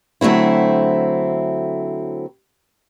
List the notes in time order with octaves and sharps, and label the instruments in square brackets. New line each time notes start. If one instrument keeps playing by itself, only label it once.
[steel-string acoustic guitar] D3 F#3 A3 C4 E4